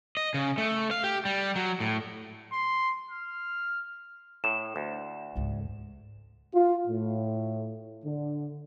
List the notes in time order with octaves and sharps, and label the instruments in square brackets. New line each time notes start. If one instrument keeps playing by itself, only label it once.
[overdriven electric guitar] D#5
C#3
A3
F5
G4
G3
F#3
A2
[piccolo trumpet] C6
F6
[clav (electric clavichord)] A2 [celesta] E7
[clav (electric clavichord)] D2
[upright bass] C#2 G#2
[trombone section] F4
A2
D3